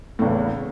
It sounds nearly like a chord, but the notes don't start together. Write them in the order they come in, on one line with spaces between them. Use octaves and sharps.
A2 E2 C#3